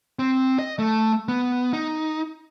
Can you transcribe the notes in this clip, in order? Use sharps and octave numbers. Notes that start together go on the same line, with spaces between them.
C4
D#5
A3
B3
D#4